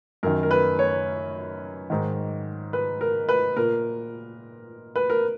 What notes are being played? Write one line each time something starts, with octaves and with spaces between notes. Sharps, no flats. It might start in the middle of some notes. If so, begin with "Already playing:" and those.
F#2 D#3 A#4
A#4
B4
C#5
G#2 D#3
B4
A#4
B4
A#2 A#4
B4
A#4